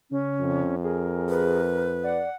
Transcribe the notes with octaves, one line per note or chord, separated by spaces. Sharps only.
C#3 C#4
F2
G#4 A#4
B4
D5 F#5